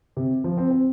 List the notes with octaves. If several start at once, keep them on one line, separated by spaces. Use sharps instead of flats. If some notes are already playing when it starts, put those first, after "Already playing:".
C3
F3
C4
C4